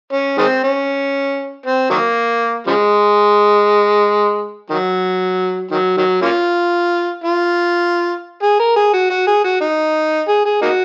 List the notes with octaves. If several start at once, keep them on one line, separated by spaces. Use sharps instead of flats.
C#4
D#3 G#3 C4
C#4
C4
D#3 F#3 A#3
C#3 F3 G#3
D#3 F#3
D#3 F#3
D#3 F#3
A#3 C#4 F4
F4
G#4
A#4
G#4
F#4
F#4
G#4
F#4
D#4
G#4
G#4
A#3 D#4 F#4